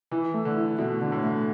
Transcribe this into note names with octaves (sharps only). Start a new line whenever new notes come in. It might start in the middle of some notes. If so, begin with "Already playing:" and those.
E3 E4
A3
D3
E4
B2 A3
D3
A2
A3